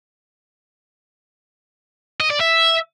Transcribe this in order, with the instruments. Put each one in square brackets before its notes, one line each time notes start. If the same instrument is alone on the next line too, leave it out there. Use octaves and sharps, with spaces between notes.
[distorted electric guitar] D#5
D5
E5